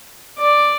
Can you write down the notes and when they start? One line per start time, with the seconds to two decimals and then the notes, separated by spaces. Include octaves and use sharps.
0.38 D5